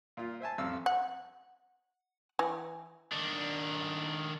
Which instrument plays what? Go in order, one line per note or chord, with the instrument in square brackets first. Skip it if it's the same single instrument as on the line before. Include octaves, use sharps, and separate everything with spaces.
[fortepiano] A#2 F4
C5 E5 G#5 A5
A1 F2 F5 E6
[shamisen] F#5
E3
[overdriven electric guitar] D#3 D4